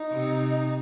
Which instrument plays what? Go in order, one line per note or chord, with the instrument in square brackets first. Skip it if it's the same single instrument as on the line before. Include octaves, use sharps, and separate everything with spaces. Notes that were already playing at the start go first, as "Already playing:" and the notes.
Already playing: [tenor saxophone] D#4
[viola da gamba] C3